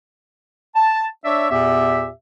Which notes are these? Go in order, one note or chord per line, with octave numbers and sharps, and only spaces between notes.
A5
D4 C#5 D5 E5
E2 A#2 B3 G4 E5